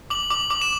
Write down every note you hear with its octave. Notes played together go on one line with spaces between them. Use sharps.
D6 F#7
D6 F#7
D6 F#7
E7